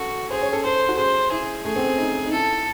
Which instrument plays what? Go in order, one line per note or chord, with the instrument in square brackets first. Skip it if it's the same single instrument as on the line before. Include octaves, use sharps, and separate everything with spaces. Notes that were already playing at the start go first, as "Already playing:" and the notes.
Already playing: [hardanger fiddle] F#4 [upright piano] A4
[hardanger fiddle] G#4 [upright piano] C5
[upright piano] C#5
A4
[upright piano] A4 [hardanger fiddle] C5
[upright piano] F#4
[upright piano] G#4 [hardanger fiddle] C5
[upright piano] E4 [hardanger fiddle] G#4
[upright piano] A3 [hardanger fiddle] G#4
[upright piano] C4
C4
D#4
D#4
[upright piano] E4 [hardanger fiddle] A4